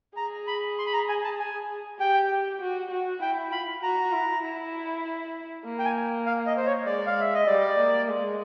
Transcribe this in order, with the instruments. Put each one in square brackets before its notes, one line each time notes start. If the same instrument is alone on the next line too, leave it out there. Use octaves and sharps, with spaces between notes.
[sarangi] G#4 [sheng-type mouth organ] A#5
[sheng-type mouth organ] B5
C6
B5
A#5
G#5
A5
G#5
[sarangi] G4 [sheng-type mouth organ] G5
[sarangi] F#4
F#4
[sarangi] E4 [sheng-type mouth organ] G5
[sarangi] F4 [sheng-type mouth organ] B5
[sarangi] F#4 [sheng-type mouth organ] A#5
[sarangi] E4
E4
A#3
[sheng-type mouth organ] G5
G#5
F5
D#5
C5
C#5
[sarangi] G#3 [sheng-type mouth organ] D5
[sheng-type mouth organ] F5
E5
D#5
[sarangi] G3 [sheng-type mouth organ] D5
[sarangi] A#3
G#3